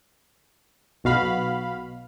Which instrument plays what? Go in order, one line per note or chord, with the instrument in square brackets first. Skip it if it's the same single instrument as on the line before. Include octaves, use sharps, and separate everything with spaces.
[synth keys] B1 B2 F#4 F5 B5